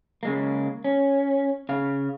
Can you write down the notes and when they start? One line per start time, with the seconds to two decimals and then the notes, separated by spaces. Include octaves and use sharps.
0.23 C#3 G#3 A#3
0.84 C#4
1.69 C#3 F5